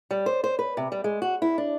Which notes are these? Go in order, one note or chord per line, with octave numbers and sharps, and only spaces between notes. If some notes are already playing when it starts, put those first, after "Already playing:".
G3
C5
C5
B4
C3
G3
G#3
F#4
E4
D4